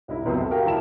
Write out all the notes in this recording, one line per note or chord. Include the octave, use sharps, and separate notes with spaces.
C2 D#4 E4
F#1 C#2 B2 C4 D#6
A4 E5 A5
F#4 G4 A#4 F5 G5
E1 E4 A5 E7